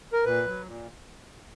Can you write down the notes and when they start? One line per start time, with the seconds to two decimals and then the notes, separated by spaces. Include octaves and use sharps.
0.13 A#4
0.25 A#2 B4
0.47 F#3
0.67 A#2